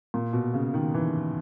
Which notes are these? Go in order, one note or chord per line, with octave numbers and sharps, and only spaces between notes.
A#2
B2
C#3
D#3
E3